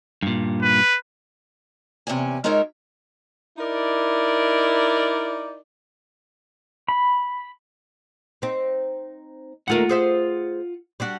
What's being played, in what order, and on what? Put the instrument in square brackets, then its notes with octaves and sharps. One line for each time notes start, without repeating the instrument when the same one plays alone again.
[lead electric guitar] G2 A#2
[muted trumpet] B4
[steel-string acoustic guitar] E2 C3 C#4 D5 G#5
G#3 D#4 F4 A#4 C#5 E5
[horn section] D#4 E4 A#4 D5
[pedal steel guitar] B5
[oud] C4 D#4
[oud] D#2 A3 A#4 [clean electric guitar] F4 F#5
[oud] G#4 C5 E5
G3 D4 F#4